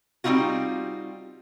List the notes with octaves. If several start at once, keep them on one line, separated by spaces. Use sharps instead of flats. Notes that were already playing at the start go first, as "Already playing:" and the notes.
G3 C4 C#4 D#4 F4 F#4